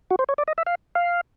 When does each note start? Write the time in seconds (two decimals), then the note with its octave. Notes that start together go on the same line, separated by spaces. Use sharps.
0.11 F#4
0.19 C5
0.29 C#5
0.38 D5
0.48 D#5
0.58 E5
0.67 F5
0.95 F5